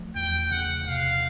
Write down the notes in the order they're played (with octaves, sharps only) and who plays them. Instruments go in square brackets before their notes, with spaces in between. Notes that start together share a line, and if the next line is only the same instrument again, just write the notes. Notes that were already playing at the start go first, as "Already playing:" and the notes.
Already playing: [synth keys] F3 A3
[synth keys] E2 [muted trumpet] G5
[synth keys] C#3 [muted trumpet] F#5
[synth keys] C3 [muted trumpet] F5